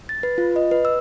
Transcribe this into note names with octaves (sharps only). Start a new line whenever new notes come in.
A6
B4
F4
D#5
B4
E6